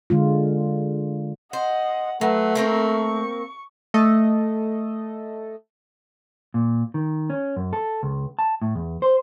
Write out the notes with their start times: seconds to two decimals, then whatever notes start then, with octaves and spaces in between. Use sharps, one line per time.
0.10 D3 G#3 F4
1.53 C5 D#5 F#5
2.21 F#3 A3 B4
2.55 A#3 C4 A#4 C#6
3.94 A3 A4 D#5
6.54 A#2
6.94 D#3
7.30 C#4
7.57 F#2
7.73 A4
8.03 C#2
8.39 A5
8.62 A2
8.75 E2
9.02 C5